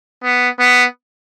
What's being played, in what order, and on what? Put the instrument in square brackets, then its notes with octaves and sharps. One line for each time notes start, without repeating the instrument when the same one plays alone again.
[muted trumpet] B3
B3